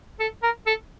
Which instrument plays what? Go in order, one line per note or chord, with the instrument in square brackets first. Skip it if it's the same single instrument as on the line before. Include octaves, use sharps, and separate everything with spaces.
[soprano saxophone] A4
A#4
A4